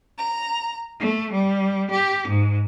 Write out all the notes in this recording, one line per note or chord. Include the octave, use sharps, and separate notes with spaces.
A#5
A3
G3
G4
G#2